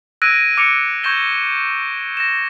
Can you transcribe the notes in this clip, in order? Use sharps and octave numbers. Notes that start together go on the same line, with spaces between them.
E6 F#6 G#6 A#6 D7 D#7
D6 F6 A#6 C#7 D7 F7
C#6 G6 G#6 A#6 E7 G7
A#6 E7